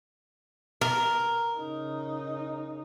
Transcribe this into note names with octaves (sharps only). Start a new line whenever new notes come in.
A#4
C#3 D#4